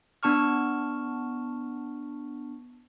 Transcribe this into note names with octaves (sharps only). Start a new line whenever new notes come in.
B3 D4 A5 C#6 F6